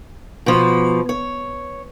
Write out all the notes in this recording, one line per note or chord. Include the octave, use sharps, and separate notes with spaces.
B2 F3
C#5